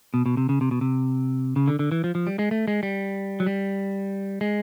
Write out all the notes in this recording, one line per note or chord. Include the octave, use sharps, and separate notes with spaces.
B2
B2
C3
C#3
C3
B2
C3
C#3
D3
D3
E3
F3
F3
G3
G#3
A3
G#3
G3
F#3
G3
G#3